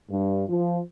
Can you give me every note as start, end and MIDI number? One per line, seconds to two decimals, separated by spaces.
0.10 0.44 43
0.49 0.79 53